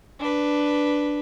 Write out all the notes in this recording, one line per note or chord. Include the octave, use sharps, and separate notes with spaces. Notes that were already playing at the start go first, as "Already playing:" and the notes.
D4 B4